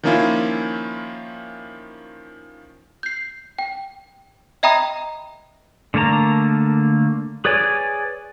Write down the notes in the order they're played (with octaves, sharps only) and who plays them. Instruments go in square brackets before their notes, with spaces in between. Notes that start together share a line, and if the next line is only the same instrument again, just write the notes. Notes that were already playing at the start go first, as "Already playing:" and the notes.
[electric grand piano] D#3 F3 A#3 C#4 E4 F4
[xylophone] G6 C7
G5
D#5 E5 G5 A#5 B5 D#6
[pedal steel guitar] D3 A3 A#3 A5 A#5
G#4 B4 C#5 D5 G#5